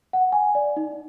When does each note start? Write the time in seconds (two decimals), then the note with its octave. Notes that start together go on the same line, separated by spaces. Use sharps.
0.13 F#5
0.32 G#5
0.55 D5
0.76 D#4